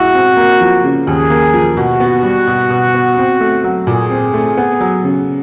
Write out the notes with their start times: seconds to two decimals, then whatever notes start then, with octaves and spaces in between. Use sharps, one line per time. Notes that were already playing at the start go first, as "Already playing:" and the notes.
Already playing: B2 G#3 E4 F#4
0.14 C4
0.37 A#3
0.61 F3
0.84 C#3
1.07 D#2 G#4
1.30 A#3
1.54 F3
1.77 B2 F#4
2.00 B3
2.23 G3
2.48 B2
2.70 B2
2.94 B3
3.18 C4
3.40 A3
3.64 F#3
3.87 A#2 G#4
4.10 C4
4.34 A3
4.57 B3
4.80 F#3
5.04 C#3